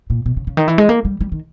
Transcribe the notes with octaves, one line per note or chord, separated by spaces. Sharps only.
A#2
B2
C#3
C#3
D#3
E3
G#3
A#3
G3
G3
D#3